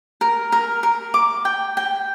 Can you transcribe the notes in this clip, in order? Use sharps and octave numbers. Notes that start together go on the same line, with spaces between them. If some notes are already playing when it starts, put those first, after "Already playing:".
A#4
A#4
A#4
D6
G5
G5